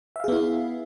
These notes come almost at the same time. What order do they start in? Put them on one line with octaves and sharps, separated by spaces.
E5 F5 G#4 B3 E4